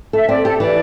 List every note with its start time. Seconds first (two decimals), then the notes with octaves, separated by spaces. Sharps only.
0.13 A4 E5
0.29 C4 D5
0.45 G4 A4
0.60 E3 D5